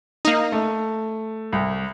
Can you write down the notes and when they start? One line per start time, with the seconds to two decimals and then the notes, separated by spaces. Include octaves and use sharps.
0.25 A#3 D#4
0.52 A3
1.53 C2